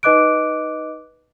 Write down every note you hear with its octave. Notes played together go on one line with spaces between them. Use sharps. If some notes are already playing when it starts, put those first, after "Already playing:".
D#4 B4 D#5 D6 F#6 D7